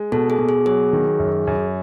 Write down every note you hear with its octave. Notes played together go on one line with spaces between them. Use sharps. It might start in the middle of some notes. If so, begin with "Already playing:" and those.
Already playing: G#3
B2 A4
G#4
B2
G#4
F#3 G#4
D#3
F#2
F#2